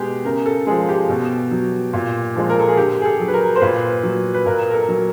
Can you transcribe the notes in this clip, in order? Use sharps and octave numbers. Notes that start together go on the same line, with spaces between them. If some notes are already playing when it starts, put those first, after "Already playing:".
Already playing: B2 G#3 G4 G#4
C#3 A#4
A4
F3 G#3 G#4
G4
B2
F#3
A#2
F3 G#3
A#4
A4
G#4
D3 G4
G#4
A4
F#3
B4
A#4
C5
A#2 B4
F#3
B4
A#2 A#4
A#4
A4
F#3